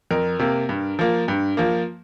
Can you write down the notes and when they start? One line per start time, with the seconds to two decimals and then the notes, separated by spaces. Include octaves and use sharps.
0.11 F2 A#4
0.39 C3 A#3
0.69 G2
0.99 F3 A#3
1.28 G2
1.57 F3 A#3